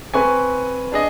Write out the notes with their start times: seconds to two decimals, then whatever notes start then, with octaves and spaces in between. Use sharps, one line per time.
0.14 C4 B4 G#5 C#6
0.92 D4 G#4 D#5